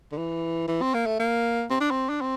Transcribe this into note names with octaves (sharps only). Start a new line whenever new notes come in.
D3
E3
E3
C4
A#3
A3
A#3
C4
D4
C4
D4
C4